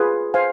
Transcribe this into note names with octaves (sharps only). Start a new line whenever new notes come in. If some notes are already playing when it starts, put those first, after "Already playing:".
Already playing: F4 G#4 B4
C5 F5 G#5